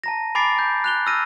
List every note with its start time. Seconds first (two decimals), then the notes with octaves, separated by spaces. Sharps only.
0.04 A5 A#5 A#6
0.35 G#5 B5 D6 A6 C7 D7
0.59 G6
0.84 F#6 F7 G7
1.06 E6 F6 A#6 D#7